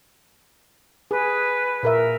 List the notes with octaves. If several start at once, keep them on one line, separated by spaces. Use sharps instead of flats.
G#4 B4
A#2 A#4 E5